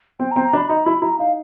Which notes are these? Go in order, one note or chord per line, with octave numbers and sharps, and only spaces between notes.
C4 G5
A#5
C4
A#5
D4
B5
D#4 A#5
E4 B5
E4 A#5
D#4 F5